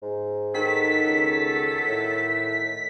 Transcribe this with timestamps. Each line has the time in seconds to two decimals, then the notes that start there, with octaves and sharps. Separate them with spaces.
0.02 G#2
0.54 D#3 F#3 B3 A4 B6
1.06 C#2
1.88 A2